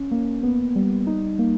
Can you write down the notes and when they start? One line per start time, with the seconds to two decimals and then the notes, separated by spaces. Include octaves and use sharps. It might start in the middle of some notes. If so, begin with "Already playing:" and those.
Already playing: C#4
0.11 A#3
0.43 B3
0.76 G3
1.07 D#4
1.39 A#3